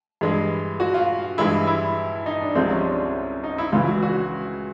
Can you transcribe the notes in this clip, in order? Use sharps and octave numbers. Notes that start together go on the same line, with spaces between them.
G2 E3 G#3
F#4
F4
G2 E3 G#3 E4
E4
D#4
D4
C2 C3 F3 G#3 C4
C#4
D4
D#4
E4
C#2 C#3 E3 F4
F#4
F#4